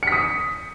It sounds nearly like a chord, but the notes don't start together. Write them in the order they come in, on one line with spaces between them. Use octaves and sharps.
C#7 B6 D#6